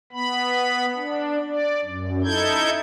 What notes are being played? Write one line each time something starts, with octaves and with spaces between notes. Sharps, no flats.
B3 B5
D4
D5
F#2
D#4 E4 A4 G6 G#6